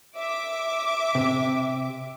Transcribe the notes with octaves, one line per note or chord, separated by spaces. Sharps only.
E5 D6
C3